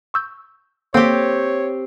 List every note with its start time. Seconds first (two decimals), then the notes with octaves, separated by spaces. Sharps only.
0.14 C#6 E6 G6
0.94 A#3 C4 G4 A4 C#5